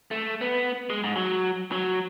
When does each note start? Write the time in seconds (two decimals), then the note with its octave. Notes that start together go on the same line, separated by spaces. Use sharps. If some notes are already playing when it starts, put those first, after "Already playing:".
0.11 A3
0.41 B3
0.90 G#3
1.04 G#2
1.16 F#3
1.72 F#3